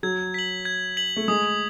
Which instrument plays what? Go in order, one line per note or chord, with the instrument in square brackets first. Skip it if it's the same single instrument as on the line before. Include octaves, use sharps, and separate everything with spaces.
[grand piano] F#3 [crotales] G#6
[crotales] B6 F#7
G#6
B6 F#7
[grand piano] A3
[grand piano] G#3 [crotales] D#6